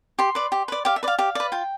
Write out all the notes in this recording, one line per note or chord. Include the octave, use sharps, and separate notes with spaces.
G4 C6
B4 D5
G4
B4 D5
G4 F5
E5
B4 D5 F5
G4 F5
B4 D5
F4 G5